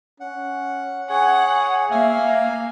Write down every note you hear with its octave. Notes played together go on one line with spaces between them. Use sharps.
C#4 F#5
G#4 C#5 F#5 G#5
A#3 E5 F5 G#5